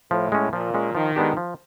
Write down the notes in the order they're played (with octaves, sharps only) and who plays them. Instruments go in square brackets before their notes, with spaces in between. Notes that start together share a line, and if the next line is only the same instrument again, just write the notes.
[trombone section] A2 [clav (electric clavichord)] F3
[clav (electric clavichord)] G#3 C#4
[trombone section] A#2 [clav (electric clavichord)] F3
[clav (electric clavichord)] G#3 C#4
[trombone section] D#3 [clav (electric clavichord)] F3
[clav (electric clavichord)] G#3 B3 D4 G4
F3